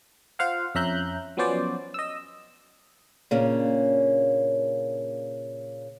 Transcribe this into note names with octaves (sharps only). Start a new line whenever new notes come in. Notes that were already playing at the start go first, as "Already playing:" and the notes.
F4 C5 F5 F#5
F2 C#4 E5 A#5 F#6 G6
F3 F#3 B3 C#4 C5 D5
D#5 E6
A#2 C#3 A#3 C#4 D4